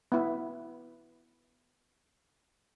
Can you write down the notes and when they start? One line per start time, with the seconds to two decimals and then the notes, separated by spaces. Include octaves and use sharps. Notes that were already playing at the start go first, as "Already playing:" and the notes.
0.12 B3 E4